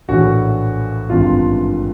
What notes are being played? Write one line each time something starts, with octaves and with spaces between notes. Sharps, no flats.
A#1 A2 E3 F#4
G#1 G2 E3 F4